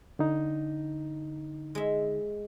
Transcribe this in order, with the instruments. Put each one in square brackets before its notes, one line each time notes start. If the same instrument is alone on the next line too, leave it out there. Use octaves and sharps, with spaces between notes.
[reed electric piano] D3 D#4
[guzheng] G#3 E5